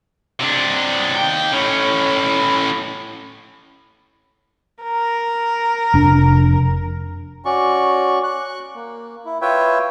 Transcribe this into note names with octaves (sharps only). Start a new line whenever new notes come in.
C3 D4
D#2 G5
A2 C#4
A#4
F1 D4
C#4 F#4 D5 C#6
C#6 F#6
A#3
E4
F4 B4 C#5 E5 G5